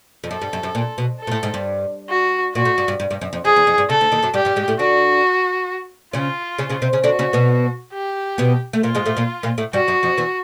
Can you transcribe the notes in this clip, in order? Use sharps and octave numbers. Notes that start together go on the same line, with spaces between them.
F2
F#2 A4
G2
F#2
F#2
A#2
B2
A4
A#2
A2
G#2
G2
F#4
A#2 F#4
A2
G2
G2
G2
G2
F#2
F2
F2 G#4
E2
F2
G2
C#3 A4
D2 D3
D#2 D#3
F#2 F#3
G2 G3 G4
G2 G3
G#2 G#3
A2 A3
D3 D4 F#4
C#3 C#4 F4
C#3 C#4
C#3 C#4
C3 C4
C#3 C#4
D3 D4 F#4
C#3 C#4
B2 B3
G4
B2 B3
A3
A#2 A#3 F4
G#2 G#3
A2 A3
A#2 A#3
A#2 A#3
A2 A3
G2 G3 F#4
F#2 F#3
F2 F3
E2 E3